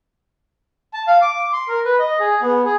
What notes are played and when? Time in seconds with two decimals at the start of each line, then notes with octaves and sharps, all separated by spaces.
0.94 A5
1.07 F5
1.22 D6
1.53 C6
1.68 A#4
1.85 B4
1.99 D#5
2.20 G#4
2.42 B3
2.65 G#4